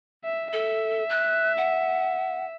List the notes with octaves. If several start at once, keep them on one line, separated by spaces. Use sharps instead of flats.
E5
A4 E5
F#6
F#5